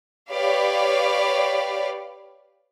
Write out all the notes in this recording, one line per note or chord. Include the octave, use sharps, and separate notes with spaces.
G4 B4 C#5 D5 F5